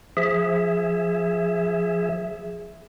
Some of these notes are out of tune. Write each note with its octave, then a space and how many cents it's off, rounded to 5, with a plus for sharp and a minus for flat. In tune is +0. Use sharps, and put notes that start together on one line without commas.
F3 +0 G#4 +0 E5 +0